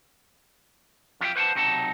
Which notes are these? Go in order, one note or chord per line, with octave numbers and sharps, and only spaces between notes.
F2 F4 G4 A#4 E5 G5
B4 C5 F#5 G5 A5
B1 C3 F#3 D#4 F#5 A5